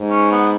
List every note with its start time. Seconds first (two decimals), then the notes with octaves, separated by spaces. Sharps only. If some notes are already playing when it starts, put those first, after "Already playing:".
Already playing: G#2
0.10 C#4
0.31 B3